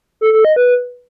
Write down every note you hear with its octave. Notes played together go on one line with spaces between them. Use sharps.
A4
A4
D#5
B4